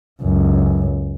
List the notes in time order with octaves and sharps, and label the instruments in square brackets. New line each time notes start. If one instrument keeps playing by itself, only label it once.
[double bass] C#2 F#2